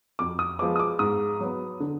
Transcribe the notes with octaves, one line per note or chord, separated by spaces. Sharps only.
F2 D6
D#6
F3 G#3 B3 D6
D#6
D6
G#2 D#6
F#3 B3
D3